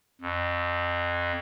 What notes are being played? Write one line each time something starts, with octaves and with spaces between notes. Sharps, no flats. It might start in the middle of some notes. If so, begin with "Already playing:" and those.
F2